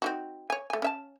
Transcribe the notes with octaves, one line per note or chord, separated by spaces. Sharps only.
C4 D#4 F#4
C#5 G#5
A3 G#5
C#4 E5 A5